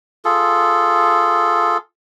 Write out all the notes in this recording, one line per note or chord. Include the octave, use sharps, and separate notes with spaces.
F4 G#4 A4